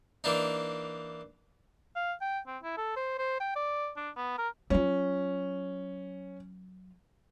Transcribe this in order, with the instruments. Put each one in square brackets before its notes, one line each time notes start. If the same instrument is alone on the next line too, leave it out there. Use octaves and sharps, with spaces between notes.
[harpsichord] E3 A#3 D4 D#4
[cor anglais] F5
G5
C4
E4
A4
C5
C5
G5
D5
D4
B3
A#4
[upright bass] F#3 F4 [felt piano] C#4